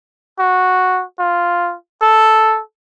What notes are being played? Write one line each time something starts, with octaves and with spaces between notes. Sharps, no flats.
F#4
F4
A4